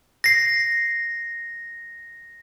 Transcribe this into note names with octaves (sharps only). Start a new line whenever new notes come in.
A#6 C7